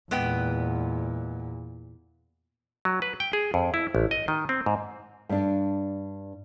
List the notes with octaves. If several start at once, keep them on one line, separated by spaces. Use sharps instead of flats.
E2 A#2 G#3 B3 G5
F#3
B4
G5
G#4
F2
E4
A1
D#5
D#3
C4
G#2
G2 D4